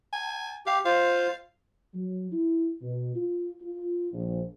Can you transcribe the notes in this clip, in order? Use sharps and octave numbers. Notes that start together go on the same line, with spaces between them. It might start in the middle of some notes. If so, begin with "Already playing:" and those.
G#5
G4 F5
F4 C5 F5
F#3
E4
B2
F4
F4
A#1